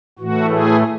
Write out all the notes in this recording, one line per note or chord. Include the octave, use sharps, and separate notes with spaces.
A2 E3 A3 F#4
G#4